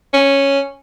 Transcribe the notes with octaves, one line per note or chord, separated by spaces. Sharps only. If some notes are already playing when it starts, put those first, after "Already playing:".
C#4